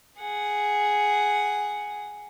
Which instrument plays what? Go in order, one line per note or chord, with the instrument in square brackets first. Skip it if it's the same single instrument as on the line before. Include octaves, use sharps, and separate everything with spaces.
[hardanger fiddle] G#4 F#5